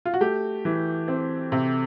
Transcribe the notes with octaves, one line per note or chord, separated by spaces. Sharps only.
F4
F#4
A3 G4
E3
C4
C3